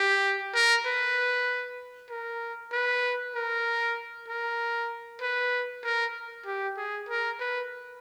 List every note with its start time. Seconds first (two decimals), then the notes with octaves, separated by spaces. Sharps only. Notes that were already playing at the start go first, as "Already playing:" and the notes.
Already playing: G4
0.55 A#4
0.86 B4
2.10 A#4
2.73 B4
3.35 A#4
4.28 A#4
5.22 B4
5.84 A#4
6.46 G4
6.77 G#4
7.09 A#4
7.40 B4